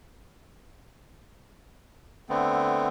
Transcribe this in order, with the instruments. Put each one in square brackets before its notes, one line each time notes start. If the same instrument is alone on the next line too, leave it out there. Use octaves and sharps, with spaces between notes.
[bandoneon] D3 A3 B3 C4